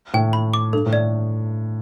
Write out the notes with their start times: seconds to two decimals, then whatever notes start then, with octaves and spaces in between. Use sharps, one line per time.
0.14 A2 G5
0.33 B5
0.54 D6
0.73 G2 A4
0.86 A2
0.93 D5